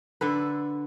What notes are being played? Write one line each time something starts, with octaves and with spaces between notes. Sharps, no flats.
D3 A4 B4